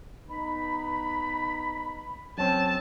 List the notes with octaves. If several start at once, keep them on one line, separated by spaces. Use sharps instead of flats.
B3 D#4 B5
F#2 C4 C#4 A4 C#5 A5